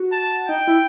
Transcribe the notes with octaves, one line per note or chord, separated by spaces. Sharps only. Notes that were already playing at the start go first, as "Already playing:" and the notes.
Already playing: F#4
A5
D#4 G5
E4